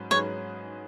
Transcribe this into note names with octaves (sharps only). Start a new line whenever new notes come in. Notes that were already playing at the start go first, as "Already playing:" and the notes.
Already playing: G#2 F#3 C#4 B4
G#2 F#3 C#4 G#4 B4 C#5